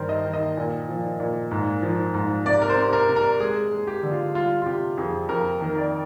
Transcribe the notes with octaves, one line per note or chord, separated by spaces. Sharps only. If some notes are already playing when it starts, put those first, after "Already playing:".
Already playing: G2 D#3 A#4 C5
D#5
D#3
D#5
A#2
F3
A#2
G#2
F3
G#2
C3 D5
A#4
C5
C3
A#4
C3
A#4
G#3 G#4
G#3
G4
D3
F4
G3 F4
F4
C3 G4
F2 G#4
F2 A#4
D#3
D5